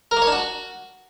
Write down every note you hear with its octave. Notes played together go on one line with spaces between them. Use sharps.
A#4
A#3
C#5
D4
F#4